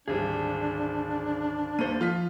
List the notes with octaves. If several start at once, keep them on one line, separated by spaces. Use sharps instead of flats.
D1 G#1 G3 D4 G#4
D#2 A#3 A4 C5 D#7
F3 F4 F6 B6